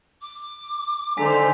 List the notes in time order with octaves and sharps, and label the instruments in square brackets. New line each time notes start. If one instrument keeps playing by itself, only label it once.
[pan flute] D6
[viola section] D3 D#3 C5 [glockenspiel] G#5 B6 [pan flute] A#5